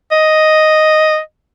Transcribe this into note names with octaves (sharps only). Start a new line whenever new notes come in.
D#5